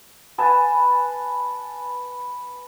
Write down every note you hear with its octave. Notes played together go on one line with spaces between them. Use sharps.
B4 G#5 A5